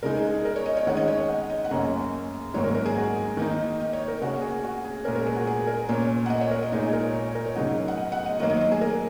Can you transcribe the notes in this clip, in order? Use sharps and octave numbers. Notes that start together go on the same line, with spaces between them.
C#3 G#3 D#4 A#4
G#4
G#4
A#4
C#5
D#5
C#5
D#3 G#3 C#4 F#5
D#5
C#5
D#5
F#5
D#5
F#5
F#2 C#3 A#3 C#4 D#5
G#2 D#3 F#3 A#3 C#4 C#5
A#4
A#4
G#4
F#4
D#3 A#3 D#4
D#5
C#5
A#4
C#3 A#3 C#4 F#4
F#4
G#4
F#4
G#4
A#2 G#3 C#4 A#4
A#4
G#4
F#4
G#4
A#4
A#2 A#3 C#4 C#5
F#5
D#5
C#5
A#4
D#5
A#2 G#3 D#4 C#5
G#4
A#4
C#5
C#5
A#4
C#5
C#3 F#3 D#4 F#5
F#5
D#5
F#5
D#5
D#3 F#3 A#3 D#5
D#5
D#5
G#4
A#4